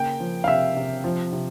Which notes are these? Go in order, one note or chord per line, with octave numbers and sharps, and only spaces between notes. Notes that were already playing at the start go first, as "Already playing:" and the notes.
Already playing: C#3 A#3 G5
F3
F5
C3 E5
C3
F3
C3